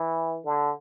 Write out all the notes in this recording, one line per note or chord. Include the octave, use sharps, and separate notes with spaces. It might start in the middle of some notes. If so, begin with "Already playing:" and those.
Already playing: E3
D3